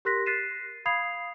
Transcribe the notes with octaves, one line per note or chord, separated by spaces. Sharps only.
G4 A#4 C6 F#6 A#6 B6
F#6 A6 B6 C7 D#7 E7
F5 B5 D#6 G#6 C7 F7